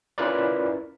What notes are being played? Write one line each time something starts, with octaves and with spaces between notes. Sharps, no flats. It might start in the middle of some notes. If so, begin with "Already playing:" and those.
C#4 E4 F4 A#4 B4 D5